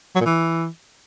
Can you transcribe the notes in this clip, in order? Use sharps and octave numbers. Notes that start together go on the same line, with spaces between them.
F#3
A#2
E3